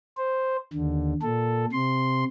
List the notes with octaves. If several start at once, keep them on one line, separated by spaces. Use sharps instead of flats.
C5
D#2 D3
A#2 A4
C3 C6